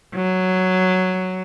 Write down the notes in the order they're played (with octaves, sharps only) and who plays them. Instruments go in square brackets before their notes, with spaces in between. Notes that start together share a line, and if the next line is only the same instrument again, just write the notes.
[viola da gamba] F#3